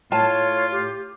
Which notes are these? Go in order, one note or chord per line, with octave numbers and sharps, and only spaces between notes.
A2 F4 C#5 A5
G4